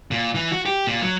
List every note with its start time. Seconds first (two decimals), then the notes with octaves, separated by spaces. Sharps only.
0.11 A#2
0.35 E3
0.52 F#4
0.66 G4
0.87 A#2
1.02 F#3